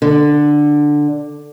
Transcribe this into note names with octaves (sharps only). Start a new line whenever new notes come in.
D3